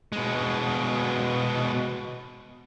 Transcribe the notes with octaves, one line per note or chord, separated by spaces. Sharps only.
B2 G#3